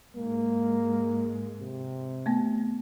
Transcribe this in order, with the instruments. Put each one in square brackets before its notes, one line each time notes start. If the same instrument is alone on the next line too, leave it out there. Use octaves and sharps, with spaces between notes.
[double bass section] G#2 G#3 [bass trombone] A#3
[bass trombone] C3
[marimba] A3 B3